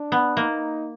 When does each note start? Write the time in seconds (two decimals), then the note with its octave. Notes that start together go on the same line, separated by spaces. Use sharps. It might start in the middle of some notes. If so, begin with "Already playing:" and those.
Already playing: D4
0.12 B3
0.37 A#3 D#4